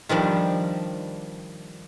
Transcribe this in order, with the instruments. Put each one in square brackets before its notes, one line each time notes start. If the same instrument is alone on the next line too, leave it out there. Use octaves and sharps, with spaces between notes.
[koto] D#3 F3 G3 D4